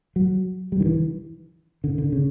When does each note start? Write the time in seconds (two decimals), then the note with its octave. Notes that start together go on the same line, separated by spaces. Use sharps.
0.16 F#3
0.72 G3
0.80 D#3
0.85 E3
1.84 D3
1.98 D3
2.12 C#3